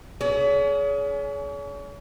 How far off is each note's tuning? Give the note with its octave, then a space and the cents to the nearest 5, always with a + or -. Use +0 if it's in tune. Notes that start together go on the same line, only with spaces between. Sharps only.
C#4 +40 G#4 +25